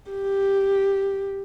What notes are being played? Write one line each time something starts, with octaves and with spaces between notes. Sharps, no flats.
G4